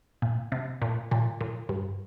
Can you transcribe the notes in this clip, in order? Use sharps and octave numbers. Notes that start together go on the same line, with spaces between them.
A#2
C3
A#2
A#2
A#2
G2